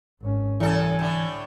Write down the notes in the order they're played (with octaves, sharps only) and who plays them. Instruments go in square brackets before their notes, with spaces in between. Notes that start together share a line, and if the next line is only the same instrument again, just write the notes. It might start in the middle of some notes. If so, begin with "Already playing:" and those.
[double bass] G#1 C#4
[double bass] C2 [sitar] F#2 A4 [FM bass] E3 [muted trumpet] G#5
[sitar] A2 D3